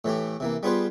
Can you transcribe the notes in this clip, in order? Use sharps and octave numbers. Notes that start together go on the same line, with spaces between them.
A2 E3 A3 G4
C3 E3 A#3
G3 B3 F4 G#4 B4 C5